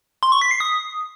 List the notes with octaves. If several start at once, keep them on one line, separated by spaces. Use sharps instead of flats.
C6
C#6
B6
C7
D#6